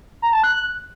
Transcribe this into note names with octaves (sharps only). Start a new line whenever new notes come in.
A#5
A5
F#6